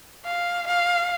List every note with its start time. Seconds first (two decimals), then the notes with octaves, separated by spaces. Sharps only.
0.25 F5
0.67 F5